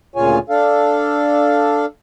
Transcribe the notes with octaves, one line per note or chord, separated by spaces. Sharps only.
D2 A#2 C#3 F4 C#5 G#5
D4 A4 F5